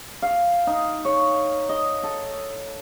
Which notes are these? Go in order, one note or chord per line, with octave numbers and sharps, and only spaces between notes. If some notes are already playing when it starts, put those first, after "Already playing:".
F5
D#4
C#5
D#5
A4